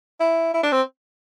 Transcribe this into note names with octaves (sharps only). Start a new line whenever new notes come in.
E4
E4
D4
C4